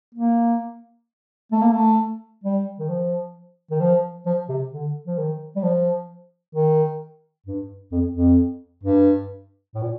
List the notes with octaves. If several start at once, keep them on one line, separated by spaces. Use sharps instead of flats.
A#3
A3
A#3
A3
G3
D#3
F3
D#3
F3
F3
C3
D3
F3
D#3
G3
F3
D#3
G2
F2
F2
G2
A2
A#2